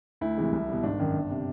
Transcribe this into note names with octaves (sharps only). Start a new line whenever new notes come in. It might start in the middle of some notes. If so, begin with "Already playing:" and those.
D2 E4
C3 E3 G#3
C2
B2 G3
G#1 D4
F#2 D#3
G1
C3